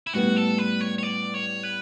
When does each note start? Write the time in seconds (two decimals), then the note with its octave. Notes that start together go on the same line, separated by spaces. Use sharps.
0.07 E4
0.13 A2 G3 B3 F#4
0.36 A4
0.58 B4
0.81 C#5
0.98 C#5
1.03 D5
1.34 C#5
1.63 B4